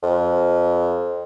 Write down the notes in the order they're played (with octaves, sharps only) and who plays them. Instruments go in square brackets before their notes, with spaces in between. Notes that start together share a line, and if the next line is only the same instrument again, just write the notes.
[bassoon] F2